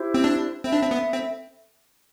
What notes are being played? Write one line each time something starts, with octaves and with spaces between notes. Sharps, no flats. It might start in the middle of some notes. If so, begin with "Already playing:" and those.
Already playing: E4 G4 C5
C4
D4
C4 A4 E5 B5
D4
C4
B3
C4